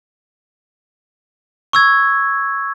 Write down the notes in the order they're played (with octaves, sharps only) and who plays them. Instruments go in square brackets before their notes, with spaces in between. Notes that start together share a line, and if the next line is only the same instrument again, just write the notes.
[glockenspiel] C#6 E6 G#6